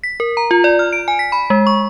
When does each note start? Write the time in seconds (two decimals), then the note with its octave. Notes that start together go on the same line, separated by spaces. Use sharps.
0.04 B6
0.20 A#4
0.37 A#5
0.51 F4
0.64 D5
0.79 F6
0.93 D7
1.08 G#5
1.19 B6
1.32 B5
1.50 G#3
1.67 C#6